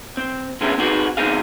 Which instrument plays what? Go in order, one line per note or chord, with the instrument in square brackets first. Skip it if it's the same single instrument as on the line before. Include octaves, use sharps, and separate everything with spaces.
[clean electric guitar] C4
D3 G#3 B3 C#4 G#4 E5
C4 D#4 F#4 G#4 B4
E2 G#3 C4 D#4 G#4 F5